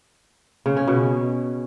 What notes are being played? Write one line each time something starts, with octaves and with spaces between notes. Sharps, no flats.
C#3
C#4
B2